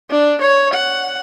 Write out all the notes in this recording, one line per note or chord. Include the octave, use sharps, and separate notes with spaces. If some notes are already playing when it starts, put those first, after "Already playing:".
D4
C#5
F#5